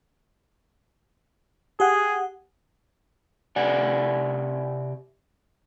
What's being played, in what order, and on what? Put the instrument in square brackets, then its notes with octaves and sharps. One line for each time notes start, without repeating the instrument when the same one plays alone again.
[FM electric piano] G4 F#5 [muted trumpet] G#4
[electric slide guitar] C3 G4 D5 F#5 G#5